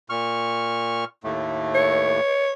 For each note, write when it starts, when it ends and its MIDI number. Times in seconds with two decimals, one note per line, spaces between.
0.10 1.05 46
0.10 1.05 85
0.10 1.05 89
1.24 2.20 39
1.24 2.20 45
1.24 2.20 57
1.75 2.52 73